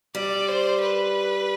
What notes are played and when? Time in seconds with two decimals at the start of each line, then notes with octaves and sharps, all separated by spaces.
0.15 G3 D5
0.48 C5
0.82 B4